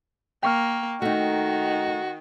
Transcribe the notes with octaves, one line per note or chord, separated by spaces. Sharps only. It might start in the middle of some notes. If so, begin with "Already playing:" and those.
A#3 G5 C#6 F6
D#3 A3 D#4 F#4